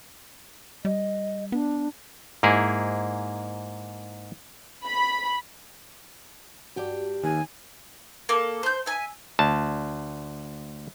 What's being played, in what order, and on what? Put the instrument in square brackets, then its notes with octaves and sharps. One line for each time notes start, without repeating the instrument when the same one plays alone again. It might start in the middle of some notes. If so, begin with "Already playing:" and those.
[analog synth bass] G3 [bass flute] D#5
[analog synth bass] B3 [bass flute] D4
[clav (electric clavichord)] G#2 A#3 E4 G#4
[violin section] B5
[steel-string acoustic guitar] G2 G4 G5 [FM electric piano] F#4 D5
[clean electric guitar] D#2 [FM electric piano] D#3 [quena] G#5
[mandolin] A#3 A4
C5 G6
E5 G#5
[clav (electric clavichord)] D2 A5